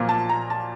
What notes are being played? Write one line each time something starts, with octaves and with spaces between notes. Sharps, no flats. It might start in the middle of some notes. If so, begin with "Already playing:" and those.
Already playing: B1 A#2 F3 A#3
A5
A#5
A5